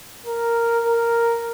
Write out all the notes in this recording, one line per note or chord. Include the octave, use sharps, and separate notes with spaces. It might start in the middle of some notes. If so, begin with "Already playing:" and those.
A#4
A#4